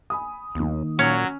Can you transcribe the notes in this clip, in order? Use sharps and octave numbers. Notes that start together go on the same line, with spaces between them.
G#5 B5 D#6
D#2 D#3 A#3
A#2 F#3 C#4